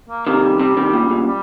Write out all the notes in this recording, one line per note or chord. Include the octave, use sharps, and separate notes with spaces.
A#3
C3 D#3 A#3
G3
C3 G3
C3 D#3
A#2 C#3
A#2 C#3
G3